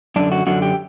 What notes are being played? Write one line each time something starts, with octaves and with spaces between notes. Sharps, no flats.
F#2 D3 D4
F#4
F#2 D3 F#4
G4